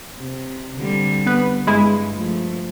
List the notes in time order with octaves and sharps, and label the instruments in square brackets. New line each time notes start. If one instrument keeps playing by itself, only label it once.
[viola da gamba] C3
D3 G3 C4
[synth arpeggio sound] B3 B4
[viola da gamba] G2 [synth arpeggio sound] G#3 E4 G#4
[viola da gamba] F3 A3